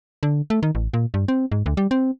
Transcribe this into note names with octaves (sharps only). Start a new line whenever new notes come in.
D3
A3
D#3
A1
A#2
G2
C4
G#2
D2
G3
C4